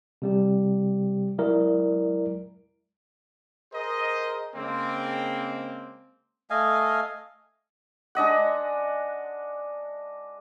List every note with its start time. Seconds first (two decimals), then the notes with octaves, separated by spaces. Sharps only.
0.22 C3 G3 G4
1.38 F#3 G#3 E4 A#4 D5
3.74 G#4 A#4 C5 D#5
4.56 C#3 G#3 A#3 C4
6.50 A3 D#5 F5 G#5
8.15 G#3 D4 D#5 F#5